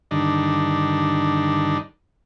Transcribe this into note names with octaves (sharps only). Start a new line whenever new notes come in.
G2 D3 D#3 D4 D#4